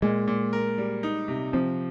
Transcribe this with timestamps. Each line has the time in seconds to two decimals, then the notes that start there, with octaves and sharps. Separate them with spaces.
0.02 A#2 G#3
0.28 A#2
0.53 A#4
0.78 G3
1.03 D#4
1.28 C3
1.53 F3 C4